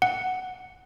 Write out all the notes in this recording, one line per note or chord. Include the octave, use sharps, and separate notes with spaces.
F#5